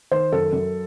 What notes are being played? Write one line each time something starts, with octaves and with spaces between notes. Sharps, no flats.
D#3 C5
F#2 A4
F#2